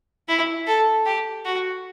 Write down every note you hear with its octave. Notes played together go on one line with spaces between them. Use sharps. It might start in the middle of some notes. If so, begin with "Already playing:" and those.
E4
A4
G4
F#4